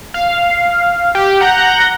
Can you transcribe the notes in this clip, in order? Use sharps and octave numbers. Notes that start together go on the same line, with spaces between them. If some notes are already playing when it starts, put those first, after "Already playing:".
F5
G4
F#5 A#5 G6 A#6